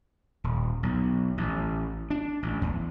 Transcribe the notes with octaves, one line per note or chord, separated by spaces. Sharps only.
D#1
B1
A1
D4
A1
E2